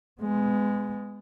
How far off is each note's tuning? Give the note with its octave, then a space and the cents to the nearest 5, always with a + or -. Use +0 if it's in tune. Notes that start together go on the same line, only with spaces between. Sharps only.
G#3 +0 B3 +30